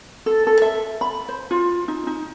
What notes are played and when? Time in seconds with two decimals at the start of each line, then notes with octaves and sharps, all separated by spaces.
0.26 A4
0.47 A4
0.62 E5
1.01 B5
1.29 C5
1.51 F4
1.88 D#4
2.07 D#4